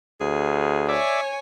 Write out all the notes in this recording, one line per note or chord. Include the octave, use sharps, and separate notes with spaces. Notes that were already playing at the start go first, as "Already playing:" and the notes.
D2 G#4
C#5 D5 E5 G#5